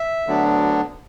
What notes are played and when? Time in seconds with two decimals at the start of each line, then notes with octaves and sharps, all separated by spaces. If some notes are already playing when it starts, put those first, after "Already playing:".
Already playing: E5
0.27 D2 D3 F#3 B3 D4